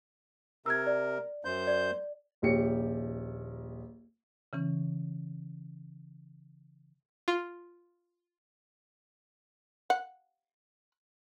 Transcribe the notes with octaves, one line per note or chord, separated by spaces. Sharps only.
C3 A#4 E6 G#6
D5
F#2 C5 G6
D5
D#1 A#1 G4 C#5 C#7
C#3 E3 C#4
F4
F#5